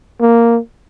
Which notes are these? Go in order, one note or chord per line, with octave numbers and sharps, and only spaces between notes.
A#3